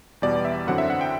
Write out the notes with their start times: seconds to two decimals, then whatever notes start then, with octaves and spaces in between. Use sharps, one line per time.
0.22 E2 B2 G3 D5
0.45 E5
0.67 F#2 D3 F#3 C4 E4 F#5
0.78 E5
0.90 F#5
1.01 G5